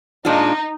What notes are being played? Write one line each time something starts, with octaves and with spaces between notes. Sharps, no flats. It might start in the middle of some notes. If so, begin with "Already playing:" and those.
A#2 G#3 D4 D#4 F4